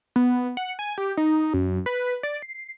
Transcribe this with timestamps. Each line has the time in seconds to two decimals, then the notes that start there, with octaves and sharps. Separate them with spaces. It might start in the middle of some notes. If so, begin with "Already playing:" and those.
0.16 B3
0.57 F#5
0.79 G#5
0.98 G4
1.17 D#4
1.54 F#2
1.86 B4
2.23 D5
2.42 C7